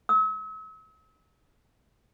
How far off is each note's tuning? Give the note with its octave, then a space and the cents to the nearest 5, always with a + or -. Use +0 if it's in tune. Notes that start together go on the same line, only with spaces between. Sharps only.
E6 -40